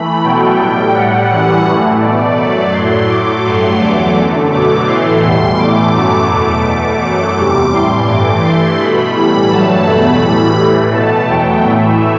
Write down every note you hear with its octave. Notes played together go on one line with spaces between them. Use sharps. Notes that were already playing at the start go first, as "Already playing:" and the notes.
Already playing: E3 A3 B5
B2 F#3 A3 G5
A2 G3
A2 G3 F#5
F#2 E3 G3
A2 E3 A3
B2 A3 D5
F#2 F#3 A3
A2 F#3 A3 C6
A2 F#3 A3 D6
G2 F#3 A3 C6
E2 D3 F#3 A3 D6
F#2 D3 A3
B2 F#3 A3 D6
A2 E3 A3 C6
E2 B2 G3
A2 E3 A3 D6
F#2 F#3 A3
E2 B2 A3 D6
E2 B2 A3 D6
F#2 F#3 A3 D6
E2 C3 G3
A2 E3 G3 C6
G2 E3 A3 D6
G2 E3 A3 C6
B2 A3 B5
A2 E3 G3
G2 F#3 A3 A5
E2 B2 F#3 A3 B5
A2 E3 G3
A2 E3 A3
B2 A3 A5
E2 B2 F#3 A3 G5
A2 E3 A3 E5